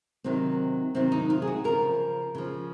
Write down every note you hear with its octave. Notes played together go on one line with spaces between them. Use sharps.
C3 D#3 F#3 C4
C3 D#3 F#3 C4
D#4
F4
G#4
F#4
C#3 F3 A#4
C#3 F3